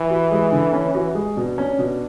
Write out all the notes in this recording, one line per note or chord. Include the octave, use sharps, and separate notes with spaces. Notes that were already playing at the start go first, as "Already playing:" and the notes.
Already playing: E3
F#4
G#3
D3
C#4
F#4
G#3
B2 D4
C#4
B2